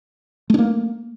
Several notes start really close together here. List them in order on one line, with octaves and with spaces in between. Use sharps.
A3 D4 A#3